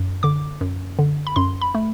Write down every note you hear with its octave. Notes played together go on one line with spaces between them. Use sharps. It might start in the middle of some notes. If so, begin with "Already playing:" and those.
Already playing: F#2
D3 D6
F#2
D3
B5
F#2 C6
B5
A3